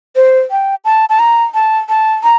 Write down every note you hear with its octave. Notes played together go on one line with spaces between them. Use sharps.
C5
G5
A5
A5
A#5
A5
A5
A#5